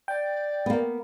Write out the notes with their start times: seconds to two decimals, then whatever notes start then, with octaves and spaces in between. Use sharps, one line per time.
0.08 D5 G5
0.66 A#3 B3